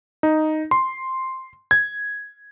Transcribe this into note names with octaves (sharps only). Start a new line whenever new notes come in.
D#4
C6
G#6